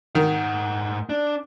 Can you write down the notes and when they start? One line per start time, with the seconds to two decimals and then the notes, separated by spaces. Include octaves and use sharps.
0.15 G#2 D#3 F#5
1.09 D4